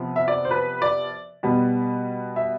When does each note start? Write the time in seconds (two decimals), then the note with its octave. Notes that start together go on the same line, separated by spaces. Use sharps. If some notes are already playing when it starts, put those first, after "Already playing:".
Already playing: C3 F3 B3
0.16 E5
0.28 D5
0.45 C5
0.51 B4
0.82 D5
1.43 B2 G3 B3
2.36 E5